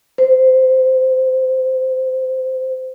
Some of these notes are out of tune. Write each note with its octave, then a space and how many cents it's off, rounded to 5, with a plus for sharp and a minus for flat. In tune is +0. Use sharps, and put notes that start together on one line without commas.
C5 -15